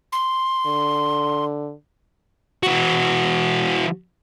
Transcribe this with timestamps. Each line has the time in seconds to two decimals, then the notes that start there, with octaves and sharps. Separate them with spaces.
0.12 C6
0.67 D3
2.63 E3 F#4